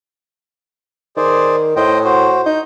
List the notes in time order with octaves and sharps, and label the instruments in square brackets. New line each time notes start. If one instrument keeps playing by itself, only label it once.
[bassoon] D#3 [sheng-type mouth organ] G#4 C5 D5
[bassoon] A2 [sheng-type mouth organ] C5 D#5 G5
[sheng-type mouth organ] F#4 C5
[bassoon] D#4 [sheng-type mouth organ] G6